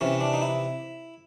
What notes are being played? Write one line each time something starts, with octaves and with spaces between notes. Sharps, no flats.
C3 E3 C#4
D4
D#4
E4